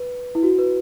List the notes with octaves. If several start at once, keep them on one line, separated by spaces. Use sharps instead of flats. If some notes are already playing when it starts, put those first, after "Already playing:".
Already playing: B4
E4
F#4
B4